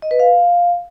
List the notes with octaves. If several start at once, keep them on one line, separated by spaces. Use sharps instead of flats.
D#5
B4
F5